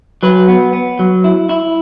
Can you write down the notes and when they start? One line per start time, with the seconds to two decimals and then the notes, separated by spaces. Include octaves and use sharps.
0.23 F#3 B4
0.48 B3
0.73 B3
0.99 F#3
1.24 E4
1.49 E4